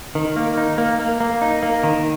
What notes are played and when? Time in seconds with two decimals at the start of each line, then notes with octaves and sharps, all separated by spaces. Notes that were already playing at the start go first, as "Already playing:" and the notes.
0.15 D#3
0.36 A#3
0.57 D#4
0.78 A#3
0.99 A#3
1.20 A#3
1.42 D#4
1.63 A#3
1.83 D#3